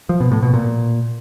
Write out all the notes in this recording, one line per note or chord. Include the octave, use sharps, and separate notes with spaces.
F3
B2
A2
B2
A#2